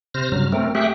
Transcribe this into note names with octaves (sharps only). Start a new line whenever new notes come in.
C3 C5 F6 A#6
G2 C#3 F#3 F6
A3 C4 A#4
A3 G4 G#4 E5 G5 F#6